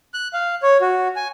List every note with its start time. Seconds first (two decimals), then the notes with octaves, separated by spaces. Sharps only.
0.14 F#6
0.33 F5
0.63 C#5
0.81 F#4
1.16 G#5